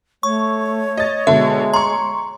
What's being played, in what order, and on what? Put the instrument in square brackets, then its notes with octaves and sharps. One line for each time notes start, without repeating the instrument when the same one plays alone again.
[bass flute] A3 [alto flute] C#5 [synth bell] C#6
[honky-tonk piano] D#5 A6
[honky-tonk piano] B2 D3 [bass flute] G#3 [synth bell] E5
[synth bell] A#5 [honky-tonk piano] C6 C#6